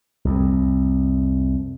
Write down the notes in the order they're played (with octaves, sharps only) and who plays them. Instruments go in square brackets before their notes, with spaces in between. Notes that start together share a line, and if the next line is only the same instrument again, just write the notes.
[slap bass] C2 F2